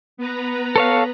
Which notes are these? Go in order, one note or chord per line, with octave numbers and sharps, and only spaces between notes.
B3 B4 A#5
A4 C#5 F5